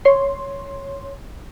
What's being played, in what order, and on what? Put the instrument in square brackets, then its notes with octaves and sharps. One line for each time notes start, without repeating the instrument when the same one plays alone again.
[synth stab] C#5 C6